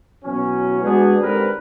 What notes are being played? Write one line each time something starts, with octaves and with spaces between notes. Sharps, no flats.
B2 E3 F#3 C#4
G#3 B3 D4 F#4 G#4
G#2 D3 G3 C4 A#4 B4